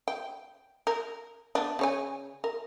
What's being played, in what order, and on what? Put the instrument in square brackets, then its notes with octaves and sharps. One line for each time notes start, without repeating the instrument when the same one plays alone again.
[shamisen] G5
A#4
B3 D4
C#3 C#5 G#5
A#4